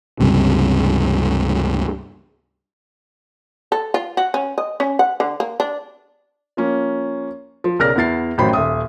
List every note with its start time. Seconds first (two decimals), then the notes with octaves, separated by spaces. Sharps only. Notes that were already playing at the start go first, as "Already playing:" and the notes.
0.20 C#2 G2 C3
3.72 A4
3.94 F4
4.17 F#4
4.34 C#4
4.58 D#5
4.80 C#4
4.99 F#5
5.20 D3
5.40 A#3
5.60 D4
6.57 F3 A#3 C#4
7.64 F3
7.79 B1 C#3 A#4 D5 F6 A#6
7.96 E2 B3 E4 A6 C7
8.38 A1 D#3 F#3 C5 B5
8.53 D#1 E5 D#6